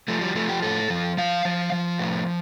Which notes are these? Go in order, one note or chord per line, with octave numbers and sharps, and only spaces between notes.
F3 A3
G3
F3 A3
G4
A2 A4
F3
F3 F5
F3
F3
A2